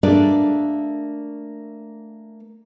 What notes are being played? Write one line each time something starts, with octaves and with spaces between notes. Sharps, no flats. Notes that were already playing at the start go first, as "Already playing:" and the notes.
A3 A#3 D4 G#4 D5